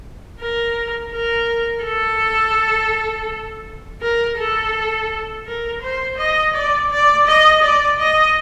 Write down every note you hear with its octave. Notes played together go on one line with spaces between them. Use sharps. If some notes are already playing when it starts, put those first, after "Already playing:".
A#4
A#4
A4
A#4
A4
A#4
C5
D#5
D5
D5
D#5
D5
D#5